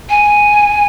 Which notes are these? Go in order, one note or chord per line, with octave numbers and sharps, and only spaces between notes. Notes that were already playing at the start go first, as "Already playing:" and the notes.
G#5